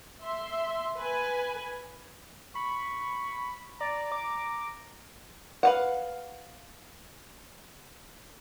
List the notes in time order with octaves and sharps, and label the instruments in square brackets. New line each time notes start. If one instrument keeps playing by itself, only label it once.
[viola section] E5 C6
B4 G#5
[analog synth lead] B5 [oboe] C#6
[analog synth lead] D5 [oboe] A#5
[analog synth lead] D6
[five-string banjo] B4 F5 F#5